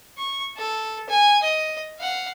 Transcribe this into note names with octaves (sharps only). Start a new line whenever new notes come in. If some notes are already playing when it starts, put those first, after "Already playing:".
C#6
A4
G#5
D#5
F5 F#5